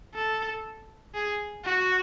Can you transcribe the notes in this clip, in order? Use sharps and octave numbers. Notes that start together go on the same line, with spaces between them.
A4
G#4
F#4